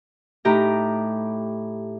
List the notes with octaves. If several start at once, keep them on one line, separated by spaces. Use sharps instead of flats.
A2 D#4 G4 A#5